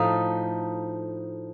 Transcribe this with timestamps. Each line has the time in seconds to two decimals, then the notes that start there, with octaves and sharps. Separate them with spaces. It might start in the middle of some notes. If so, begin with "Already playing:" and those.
Already playing: A2 F3 A3 D#4 F5